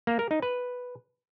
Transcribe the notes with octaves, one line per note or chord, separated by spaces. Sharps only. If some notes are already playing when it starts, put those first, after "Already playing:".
A#3
A#4
D#4
B4